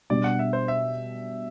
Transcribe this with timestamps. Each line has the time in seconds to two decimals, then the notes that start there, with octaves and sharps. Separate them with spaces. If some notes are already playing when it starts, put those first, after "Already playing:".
0.10 B2 G3 D4 D5
0.24 F#5
0.39 E5
0.53 C5
0.68 E5